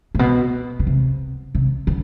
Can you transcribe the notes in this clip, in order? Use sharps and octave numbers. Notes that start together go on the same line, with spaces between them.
A2
B2
B2
C3
C3
D3